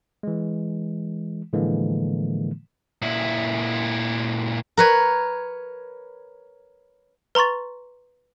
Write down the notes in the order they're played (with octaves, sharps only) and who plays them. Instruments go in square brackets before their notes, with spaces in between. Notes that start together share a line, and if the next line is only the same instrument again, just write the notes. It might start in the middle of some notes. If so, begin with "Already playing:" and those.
[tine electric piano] E3 G#3
A2 D3 E3 F3 G#3 A#3
[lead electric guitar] A#2 E4
[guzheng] A#4 B4 C#5
[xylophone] B4 A#5 C6 C#6 A6